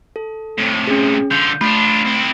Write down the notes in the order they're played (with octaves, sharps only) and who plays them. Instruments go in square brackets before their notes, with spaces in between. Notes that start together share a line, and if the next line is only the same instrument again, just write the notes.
[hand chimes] A4
[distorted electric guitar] A2 C3
[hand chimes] C#4 G#4
[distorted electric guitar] D3 F4 [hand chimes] G6
[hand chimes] A3 B5 [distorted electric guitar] D4 F4
[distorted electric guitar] C4 E4